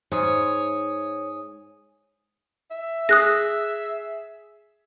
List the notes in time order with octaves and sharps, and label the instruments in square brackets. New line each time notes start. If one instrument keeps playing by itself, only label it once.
[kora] G#2 [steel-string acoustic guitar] C#5 [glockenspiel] G#5 D#6 D#7
[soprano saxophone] E5
[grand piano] G#4 [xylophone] D#6 F#6 A#6